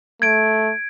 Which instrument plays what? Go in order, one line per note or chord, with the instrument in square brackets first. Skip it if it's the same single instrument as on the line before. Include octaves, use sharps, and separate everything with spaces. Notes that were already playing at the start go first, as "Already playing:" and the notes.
[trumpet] A3 [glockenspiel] G#6 D7